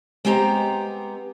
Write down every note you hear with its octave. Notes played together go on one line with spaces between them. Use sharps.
G#3 B3 C4 G4 A#5